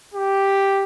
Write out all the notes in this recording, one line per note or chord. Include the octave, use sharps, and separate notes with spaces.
G4